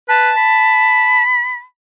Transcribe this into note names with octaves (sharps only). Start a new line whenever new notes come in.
B4 A5
B5